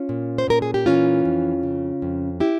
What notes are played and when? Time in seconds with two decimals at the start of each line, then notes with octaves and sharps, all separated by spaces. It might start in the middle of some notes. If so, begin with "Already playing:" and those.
Already playing: C#4 F4
0.09 A#2
0.38 C5
0.48 A#2 A#4
0.62 G#4
0.74 G4
0.86 E3 C#4 F4
1.25 F2
1.63 C#3
2.02 F2
2.40 E4 G4